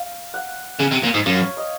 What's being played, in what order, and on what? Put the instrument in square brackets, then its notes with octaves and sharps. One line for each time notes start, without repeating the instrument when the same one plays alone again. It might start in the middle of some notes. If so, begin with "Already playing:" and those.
Already playing: [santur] F5
F#5
[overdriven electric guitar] C#3
C3
A#2
G#2
[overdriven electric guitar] F#2 [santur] F5
[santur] C#5
D#5